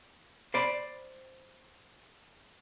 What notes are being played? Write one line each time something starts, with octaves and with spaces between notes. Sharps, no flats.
C5 D5 B5